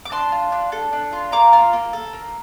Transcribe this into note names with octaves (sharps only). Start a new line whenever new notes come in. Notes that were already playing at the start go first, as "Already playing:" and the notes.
D6
D4 A5 C6
F4
D4
A4
D4
F4
A#3 A#5 D6
F4
A#3
A4
A#3